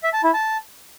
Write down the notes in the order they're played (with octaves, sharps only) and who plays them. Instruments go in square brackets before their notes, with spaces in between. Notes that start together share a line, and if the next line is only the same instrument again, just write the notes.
[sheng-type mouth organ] E5
A5
E4
A5